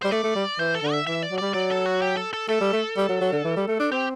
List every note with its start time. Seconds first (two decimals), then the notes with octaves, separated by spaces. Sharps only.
0.02 G3 C5
0.11 A3 D5
0.23 A3
0.35 G3
0.59 E3 C5
0.75 A4
0.83 D3
0.92 E5
1.07 E3 E5
1.23 D5
1.31 F#3
1.38 G3 D5
1.54 F#3 D5
1.70 A4
1.86 F#4
2.02 G4
2.17 A4
2.33 A4
2.49 A3 A4
2.61 G3
2.73 A3
2.97 G3
3.09 F#3
3.21 F#3
3.32 D3
3.44 E3
3.56 G3
3.68 A3
3.79 D4
3.91 C4 G4